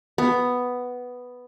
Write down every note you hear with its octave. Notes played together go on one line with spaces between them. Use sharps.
B3